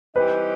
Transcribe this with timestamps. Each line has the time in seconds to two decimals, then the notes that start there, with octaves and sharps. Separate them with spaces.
0.16 E3 G3 C4 D#4 G4 B4